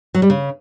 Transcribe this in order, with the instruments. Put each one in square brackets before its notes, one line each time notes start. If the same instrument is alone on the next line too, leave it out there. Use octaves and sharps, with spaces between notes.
[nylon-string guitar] F#3
G3
C#3